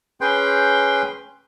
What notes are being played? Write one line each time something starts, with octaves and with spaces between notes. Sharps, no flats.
C#4 G#4 B4 G5 C6 G6